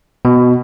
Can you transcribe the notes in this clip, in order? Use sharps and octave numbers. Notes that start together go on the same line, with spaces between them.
B2